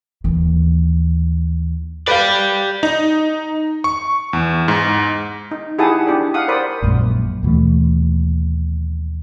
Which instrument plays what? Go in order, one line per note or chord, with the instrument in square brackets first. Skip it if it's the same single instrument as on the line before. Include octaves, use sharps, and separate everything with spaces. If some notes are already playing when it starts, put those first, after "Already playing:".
[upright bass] D#2 E3
[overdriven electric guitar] G4 D5 [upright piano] B4 F5
[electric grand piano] D#4
C#6
E2
G#2
[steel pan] D#4
E4 G4 G#4 F#5 A5 D#6
D4 G4 D5
F5 F#5 D#6
A#4 C5 D5 B5 D#6
[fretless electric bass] A#1 F#2 A#2 G#3
D#2 B2 E3 A3